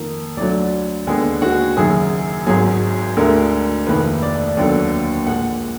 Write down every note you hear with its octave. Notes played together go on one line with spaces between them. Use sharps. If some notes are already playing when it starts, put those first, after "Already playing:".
Already playing: F2 D#3 A#3 A#4
D2 D3 F#3 D5
D#2 D3 G#3 B3 G#4
F#4
F#1 F#2 D#3 G#4
G#1 G#2 F#3 G#4
D2 D3 G#3 A#4
F1 F2 D#3 A#3 B4
D5
D#2 D3 F#3 B3 D5
A#1 A#2 G#3 F#5